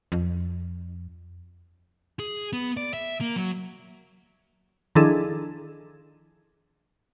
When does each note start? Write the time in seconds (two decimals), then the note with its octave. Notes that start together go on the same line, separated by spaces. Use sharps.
0.12 F2
2.20 G#4
2.53 B3
2.77 D5
2.94 E5
3.21 A#3
3.36 F#3
4.95 D#3 F3 D4 E4 G#4 A4